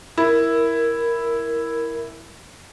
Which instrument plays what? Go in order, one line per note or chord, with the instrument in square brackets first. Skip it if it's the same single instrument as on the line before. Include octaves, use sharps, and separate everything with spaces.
[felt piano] E4 [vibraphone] A#4